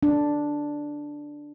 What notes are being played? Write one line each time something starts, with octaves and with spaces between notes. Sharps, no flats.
D4